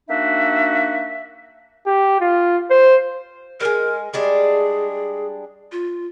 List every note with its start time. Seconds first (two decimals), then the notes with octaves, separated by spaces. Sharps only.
0.09 A#3 D4 D#4 F#4 E5
1.87 G4
2.21 F4
2.70 C5
3.60 G3 G#3 A#4
4.14 G3 G#3 D4 G#4
5.72 F4